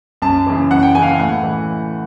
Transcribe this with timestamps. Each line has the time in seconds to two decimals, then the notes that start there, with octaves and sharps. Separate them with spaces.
0.22 F#2 A5
0.46 C#3 E3
0.71 F#2 F#5
0.82 G5
0.95 C#3 E3 G#5
1.02 F5
1.07 F#5
1.19 A2 F#5
1.43 E3